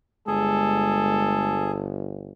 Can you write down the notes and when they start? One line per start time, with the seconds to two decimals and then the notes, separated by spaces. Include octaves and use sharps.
0.27 G1 G#3 G#4 A4